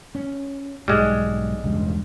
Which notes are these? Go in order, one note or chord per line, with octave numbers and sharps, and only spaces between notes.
C#4
B1 G#2 G3 G#3
E1 C#2 G2